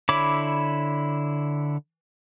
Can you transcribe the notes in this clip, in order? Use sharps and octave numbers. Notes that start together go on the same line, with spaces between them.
D3 E4 C#5 B5 D6